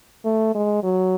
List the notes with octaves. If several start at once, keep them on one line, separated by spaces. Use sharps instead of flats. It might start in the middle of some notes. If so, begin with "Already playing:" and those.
A3
G#3
F#3